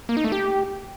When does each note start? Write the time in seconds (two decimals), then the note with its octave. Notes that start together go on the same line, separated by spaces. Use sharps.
0.09 A#3
0.17 D#4
0.24 A3
0.32 G4